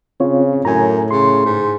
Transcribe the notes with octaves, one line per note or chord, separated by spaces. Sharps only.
C#3 C4 F4 C#5
F#2 A2 G#5 A#5
C#3 C6
G#2